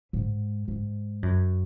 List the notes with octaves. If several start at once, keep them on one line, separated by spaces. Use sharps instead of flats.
G#2
G#2
F#2